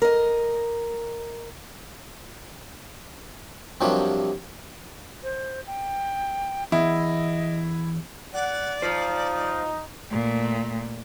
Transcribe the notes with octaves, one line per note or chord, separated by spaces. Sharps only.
A#4 D#5
G2 C3 F3 F#3 A#3
C5
G5
E2 E4 D#5
D5 F#5
D#4 F4 C5
A#2 A3